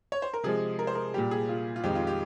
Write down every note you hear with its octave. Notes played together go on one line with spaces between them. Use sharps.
C#5
C5
A#4
C3 F3 G#3 G#4
A#4
C5
A#4
A#2 G3 G4
G#4
F4
F4
F2 D#3 G#3 G4
F4
G4